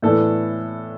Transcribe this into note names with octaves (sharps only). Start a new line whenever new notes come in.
A2 E3 B3 D4 A4